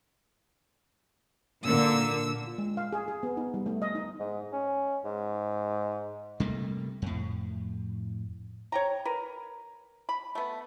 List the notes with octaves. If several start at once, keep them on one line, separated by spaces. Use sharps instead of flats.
A#2 D3 A#3 E6
F4
G#3
F5
G#4
G#4
B3
D#4
G3
A3
D#5
D#4
G#2
C#4
G#2
C3 G3 A3 A#3
F2 A2
C#5 G5 A#5
A#4 B4
B5
A3 B3